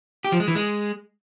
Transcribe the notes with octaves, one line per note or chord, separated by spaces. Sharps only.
G4
F3
G#3
E3
G#3